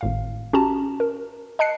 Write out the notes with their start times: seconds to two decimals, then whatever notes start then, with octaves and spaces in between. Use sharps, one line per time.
0.01 G#1 A2 F5
0.53 C#4 F#4 G4 A5 A#5
1.00 A#4
1.59 D#5 A5 F#6 C7 C#7